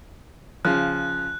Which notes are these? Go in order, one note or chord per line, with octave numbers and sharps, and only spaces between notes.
C#3 F3 F#6